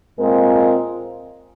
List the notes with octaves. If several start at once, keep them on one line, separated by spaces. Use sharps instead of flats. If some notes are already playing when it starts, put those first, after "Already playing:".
A#2 G#3 C4 F4 A#4